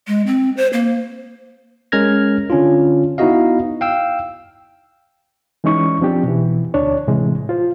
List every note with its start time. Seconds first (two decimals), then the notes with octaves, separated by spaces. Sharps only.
0.07 G#3
0.27 C4
0.57 C5
0.73 A#3
1.92 G#3 C#4 A#4 F6 G#6 A#6
2.50 D3 C#4 D4 F4
3.18 B3 D#4 E4 F#4 D#5 F5
3.81 F5 G5 E6
5.64 E3 G#3 C#4 D#4 C#6
6.01 F3 C4 D4 G4
6.23 B2 E3
6.74 D2 D4 C#5
7.07 A2 C3 E3 G#3
7.49 F4 C5